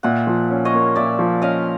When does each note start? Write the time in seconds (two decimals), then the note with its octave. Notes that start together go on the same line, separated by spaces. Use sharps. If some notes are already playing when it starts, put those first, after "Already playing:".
0.03 A#2 E5 F#5
0.27 F3
0.50 C#4
0.65 C#5 D#5
0.74 A#3
0.96 A#2 D5 E5
1.19 F3
1.42 C#4 D#5 F5